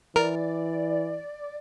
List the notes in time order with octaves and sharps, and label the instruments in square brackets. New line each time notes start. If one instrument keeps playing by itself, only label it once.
[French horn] E3 [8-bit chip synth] A#4 [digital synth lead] D5